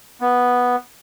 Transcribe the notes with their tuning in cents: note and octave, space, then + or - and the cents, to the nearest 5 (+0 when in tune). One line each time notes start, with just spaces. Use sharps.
B3 -5